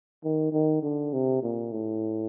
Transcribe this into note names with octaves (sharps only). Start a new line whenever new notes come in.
D#3
D#3
D3
C3
A#2
A2